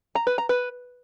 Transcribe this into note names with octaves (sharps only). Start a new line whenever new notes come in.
A#5
B4
A#5
B4